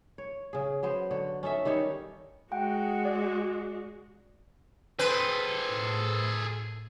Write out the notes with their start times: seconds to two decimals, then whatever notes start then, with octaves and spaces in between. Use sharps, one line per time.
0.18 C#5
0.53 C#3 G#4
0.83 F#3 B3 C5
1.11 D3 C#5
1.43 C#4 D#4 A4 E5
1.65 D#3 G3 D#4 C#5
2.52 G#3 F#4 F#5 G5
3.05 D5
4.99 C4 G#4 A4 B4
5.67 A2